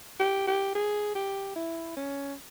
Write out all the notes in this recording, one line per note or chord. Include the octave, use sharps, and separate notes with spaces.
G4
G4
G#4
G4
E4
C#4